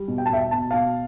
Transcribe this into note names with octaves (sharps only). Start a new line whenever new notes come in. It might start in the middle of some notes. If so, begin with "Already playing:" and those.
Already playing: G3
B2
G5
A5
B2 E5 G5
B2 A5
B2 F5 A5